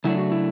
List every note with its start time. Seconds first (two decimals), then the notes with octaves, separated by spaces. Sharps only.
0.04 C#3 F#3 A3 D4 E4
0.18 F#4
0.32 E4